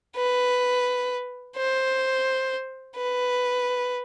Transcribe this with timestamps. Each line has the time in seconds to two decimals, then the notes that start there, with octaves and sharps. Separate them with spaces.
0.16 B4
1.56 C5
2.96 B4